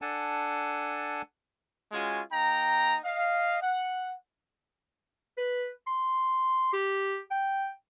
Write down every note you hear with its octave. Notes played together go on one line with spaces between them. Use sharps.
D4 A4 F#5 G#5 A5
G#3 C#4 F4 F#4 G#5
A#3 D#4 G5 A#5
D#5 F5
F#5
B4
C6
G4
G5